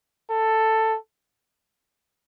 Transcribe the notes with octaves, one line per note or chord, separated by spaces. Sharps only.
A4